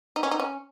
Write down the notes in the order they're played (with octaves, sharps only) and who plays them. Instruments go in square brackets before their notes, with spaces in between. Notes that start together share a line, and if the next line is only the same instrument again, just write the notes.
[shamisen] D#4
C#4
D#4
C#4